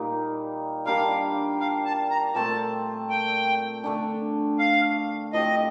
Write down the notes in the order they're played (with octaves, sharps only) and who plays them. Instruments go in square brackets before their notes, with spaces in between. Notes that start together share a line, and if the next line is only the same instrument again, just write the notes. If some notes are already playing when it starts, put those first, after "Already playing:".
Already playing: [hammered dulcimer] A#2 G3 A#3 D#4
[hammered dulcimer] G3 A#3 D4 G4 [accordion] F5
[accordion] F5
A5
A#5
[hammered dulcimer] A#2 A3 C4 [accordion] A5
[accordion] G5
[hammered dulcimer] D3 A3 D4
[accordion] F5
[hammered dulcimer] A2 F3 C4 G4 [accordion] D#5